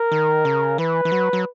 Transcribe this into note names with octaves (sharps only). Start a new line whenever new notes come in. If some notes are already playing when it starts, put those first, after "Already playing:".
Already playing: A#4
D#3
C#3
E3 B4
E3
F#3
F#3